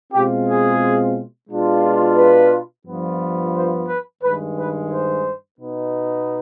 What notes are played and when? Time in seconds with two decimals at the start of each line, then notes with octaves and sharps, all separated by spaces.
0.12 B2 G#3 C4 F4 G4
0.47 G#4
1.49 B2 G#3 D4 F4
2.17 B4
2.86 G2 F3 B3 F4
3.55 C5
3.88 B4
4.23 G2 D#3 G#3 B4
4.57 B4
4.91 C5
5.59 B2 B3 D#4